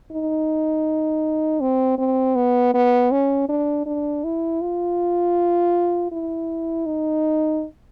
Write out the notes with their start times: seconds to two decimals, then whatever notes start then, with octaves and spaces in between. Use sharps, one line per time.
0.11 D#4
1.61 C4
1.98 C4
2.36 B3
2.74 B3
3.11 C#4
3.49 D4
3.86 D4
4.24 E4
4.61 F4
6.11 E4
6.86 D#4